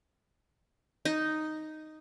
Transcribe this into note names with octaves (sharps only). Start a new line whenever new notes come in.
D#4